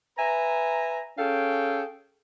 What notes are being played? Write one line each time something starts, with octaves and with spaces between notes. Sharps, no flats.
B4 E5 G#5 A#5
C#4 G#4 A4 F5 G5